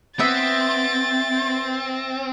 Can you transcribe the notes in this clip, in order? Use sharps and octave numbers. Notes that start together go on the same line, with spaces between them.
B3 C4 E5 A6